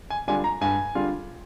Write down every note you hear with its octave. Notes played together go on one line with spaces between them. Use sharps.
G#5
D3 G3 D4 F4 G#5
A#5
G2 G#5
D3 G3 D4 F4